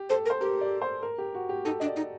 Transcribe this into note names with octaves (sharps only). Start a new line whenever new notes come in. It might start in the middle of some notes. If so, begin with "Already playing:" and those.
Already playing: G4
A4 C5
A#4
C5
G4 A#4
D5
C5
A#4
G4
F#4
G4
D#4 A4
D4 D#5
D5
D#4